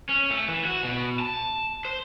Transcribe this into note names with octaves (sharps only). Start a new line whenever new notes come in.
C#4
A3
E3
F#4
B2
A5
C5